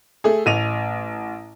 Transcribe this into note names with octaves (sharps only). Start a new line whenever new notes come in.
A3 G#4
A1 D#7 F7